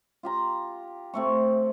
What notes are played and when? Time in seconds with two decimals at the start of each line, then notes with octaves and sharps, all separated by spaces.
0.23 F4 G4 A#5
1.14 C3 A3 C#6